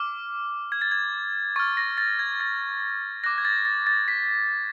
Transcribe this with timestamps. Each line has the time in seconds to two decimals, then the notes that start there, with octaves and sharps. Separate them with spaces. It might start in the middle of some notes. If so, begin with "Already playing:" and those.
Already playing: D6 F6
0.72 G#6
0.81 A6
0.92 G#6
1.56 C#6 A6
1.59 F6
1.77 A#6
1.98 A6
2.19 G#6
2.40 A6
3.24 D6 F#6 A#6
3.38 G#6
3.45 A6
3.65 A6
3.87 A6
4.08 B6